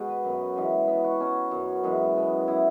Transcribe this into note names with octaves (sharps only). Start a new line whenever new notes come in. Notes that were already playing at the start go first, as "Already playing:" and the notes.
Already playing: B2 G#3 B3 F#4 G#4
B4
F#2 F#3 B3
C#3 E3 G#3
B2 B3 B4
F#4
B2 B3 C#4
F#2 F#3 B3
F#2 E3 G#3 B3
B2 B3
E3 B3 E4